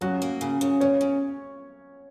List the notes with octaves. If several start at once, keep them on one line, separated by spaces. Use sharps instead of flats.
C#3 F#3 F#4
A#3
C#3
C#3
C#3 C#4 C#5
C#3